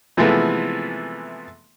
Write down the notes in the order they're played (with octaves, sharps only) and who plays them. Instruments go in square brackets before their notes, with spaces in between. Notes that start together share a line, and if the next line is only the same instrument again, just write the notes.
[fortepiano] C3 E3 F3 G#3 A3 B3